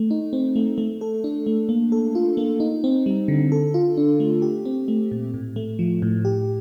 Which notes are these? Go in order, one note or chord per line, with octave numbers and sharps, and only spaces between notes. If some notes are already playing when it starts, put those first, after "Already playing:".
Already playing: A3
D#4
C4
A3
A3
A4
D4
A3
A#3
A4
F4
A#3
D#4
C4
G3
D3
A4
F4
D4
A3
G4
C4
A3
A#2
A2
A3
F3
A2
G4